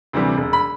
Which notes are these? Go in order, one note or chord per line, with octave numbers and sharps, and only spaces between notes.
D2 C3 E3 G3
E1
B5